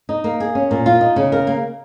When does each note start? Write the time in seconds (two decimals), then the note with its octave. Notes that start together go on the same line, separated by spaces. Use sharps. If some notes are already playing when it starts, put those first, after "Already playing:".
0.09 D#4
0.24 A#3
0.40 G#4
0.55 C#4
0.71 A#2
0.86 F4
1.01 D#4
1.16 C#3
1.32 A#4
1.47 A#3